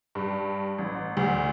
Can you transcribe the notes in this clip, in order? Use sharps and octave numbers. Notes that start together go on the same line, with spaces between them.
G2
A1
D2